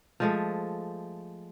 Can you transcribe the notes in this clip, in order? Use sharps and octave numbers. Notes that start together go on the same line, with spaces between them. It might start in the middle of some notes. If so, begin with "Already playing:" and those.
F3 G#3 A3